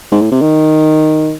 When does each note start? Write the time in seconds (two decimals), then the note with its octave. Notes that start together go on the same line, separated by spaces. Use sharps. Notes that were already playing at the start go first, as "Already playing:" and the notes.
0.12 G#2
0.21 A2
0.32 C3
0.41 D#3